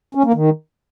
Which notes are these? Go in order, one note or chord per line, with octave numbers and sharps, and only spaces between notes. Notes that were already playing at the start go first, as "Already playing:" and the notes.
C#4
A#3
D#3